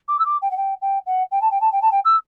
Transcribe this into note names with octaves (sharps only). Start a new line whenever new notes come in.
D6
E6
D6
G5
F#5
G5
G5
F#5
G5
A5
G5
A5
G5
A5
G5
E6